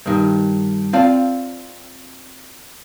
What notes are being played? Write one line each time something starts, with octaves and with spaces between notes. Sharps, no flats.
G2 D#3
C4 F4 D5 F5 A5